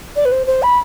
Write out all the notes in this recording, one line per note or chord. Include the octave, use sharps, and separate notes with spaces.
D5
B4
C5
C5
B5